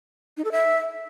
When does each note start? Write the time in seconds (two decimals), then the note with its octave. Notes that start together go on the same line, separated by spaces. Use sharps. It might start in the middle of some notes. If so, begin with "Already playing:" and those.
0.37 D#4
0.44 A4
0.52 E5